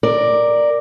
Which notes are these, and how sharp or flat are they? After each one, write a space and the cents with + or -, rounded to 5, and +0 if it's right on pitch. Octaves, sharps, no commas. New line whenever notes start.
A#4 +0 D5 +10